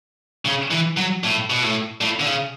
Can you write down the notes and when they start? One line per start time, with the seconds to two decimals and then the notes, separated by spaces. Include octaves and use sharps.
0.45 C#3
0.71 E3
0.97 F#3
1.24 A2
1.50 B2
1.62 A2
2.01 A2
2.20 D3
2.26 C#3